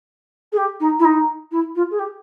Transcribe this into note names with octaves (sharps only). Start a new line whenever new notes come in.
G#4
G4
D#4
E4
D#4
E4
F4
G#4
G4